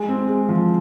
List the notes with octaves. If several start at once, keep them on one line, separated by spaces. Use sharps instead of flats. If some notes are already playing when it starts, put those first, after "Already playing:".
Already playing: G#3
C4
G#3
F3